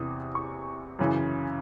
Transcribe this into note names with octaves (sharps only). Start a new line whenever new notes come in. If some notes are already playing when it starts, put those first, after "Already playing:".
Already playing: E2 C3 E3 D#6
C#6
F#2 C#3 E3